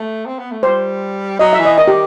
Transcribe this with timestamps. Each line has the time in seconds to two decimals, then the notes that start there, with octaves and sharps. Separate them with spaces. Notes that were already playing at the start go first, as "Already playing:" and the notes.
Already playing: A3
0.26 C4
0.39 B3
0.52 A3
0.63 G3 C5
1.39 F#3 D#5
1.53 E5
1.59 E3
1.65 D#5
1.78 D#3 D#5
1.88 G4